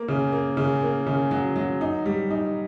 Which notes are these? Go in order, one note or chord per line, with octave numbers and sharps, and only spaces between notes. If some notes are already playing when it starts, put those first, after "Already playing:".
Already playing: A#3
C#3
A#3
C#3
A#3
C#3
F#3
F#3
D#4
G3
D#4